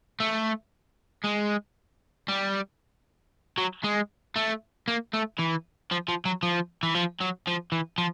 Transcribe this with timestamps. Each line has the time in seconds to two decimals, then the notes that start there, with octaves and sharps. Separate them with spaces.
0.20 A3
1.24 G#3
2.28 G3
3.58 F#3
3.84 G#3
4.36 A3
4.88 A#3
5.14 A3
5.39 E3
5.92 F3
6.09 F3
6.25 F#3
6.43 F3
6.83 E3
6.95 F3
7.20 F#3
7.47 F3
7.72 E3
7.98 F3